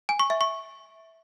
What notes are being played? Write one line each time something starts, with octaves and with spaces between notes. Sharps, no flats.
G#5
C#6
E5
C#6